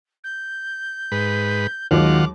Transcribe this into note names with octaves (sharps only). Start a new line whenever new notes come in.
G6
G#2 B4
D#2 D#3 F#3 G#3 F4 F#5 D6